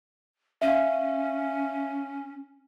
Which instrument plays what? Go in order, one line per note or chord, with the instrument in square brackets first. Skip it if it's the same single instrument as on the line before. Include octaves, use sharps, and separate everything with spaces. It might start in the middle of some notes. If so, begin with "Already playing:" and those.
[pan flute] C#4 [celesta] E5 F5